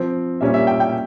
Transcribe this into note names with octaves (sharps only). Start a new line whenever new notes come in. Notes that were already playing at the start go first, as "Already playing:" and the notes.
Already playing: F3 C4
A#2 G3 C#4 E5
E5
G5
G5